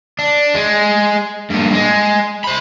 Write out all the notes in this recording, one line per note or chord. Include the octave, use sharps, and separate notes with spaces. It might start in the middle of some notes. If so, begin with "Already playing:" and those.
D4
G#3
G2 A#2
G#3
C5 B5